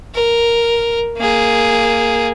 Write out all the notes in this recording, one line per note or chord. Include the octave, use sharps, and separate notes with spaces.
A#4
A#3 G#4